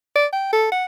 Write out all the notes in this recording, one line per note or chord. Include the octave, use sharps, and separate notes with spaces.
D5
G5
A4
F#5